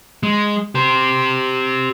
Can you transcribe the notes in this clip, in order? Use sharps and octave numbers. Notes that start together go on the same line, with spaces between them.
G#3
G4 C5